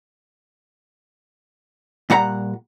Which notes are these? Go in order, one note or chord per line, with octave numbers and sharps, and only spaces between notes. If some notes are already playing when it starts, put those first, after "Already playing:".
A#2 G3 F#5 A#5